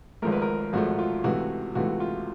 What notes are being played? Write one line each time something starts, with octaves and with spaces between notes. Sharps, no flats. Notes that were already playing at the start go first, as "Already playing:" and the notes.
G#1 G#2 F3 A3 A#4
B4
A#4
G#1 G#2 F3 A3 F#4
F4
C#2 C3 E3 A3 F#4
C#2 C3 E3 A3 F#4
F4